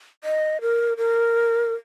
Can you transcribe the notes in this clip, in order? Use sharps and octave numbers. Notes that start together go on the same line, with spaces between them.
D#5
A#4
A#4